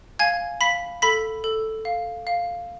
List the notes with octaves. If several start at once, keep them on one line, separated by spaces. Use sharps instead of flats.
F5 G#5 G#6
F5 B5 B6
A4 B5 B6
A4
F5
F5